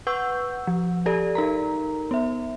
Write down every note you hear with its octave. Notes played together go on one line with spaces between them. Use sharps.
B4 F#5 C#6 E6 G6
F3
G4 A4 D5
D#4 A#4 A#5
B3 E5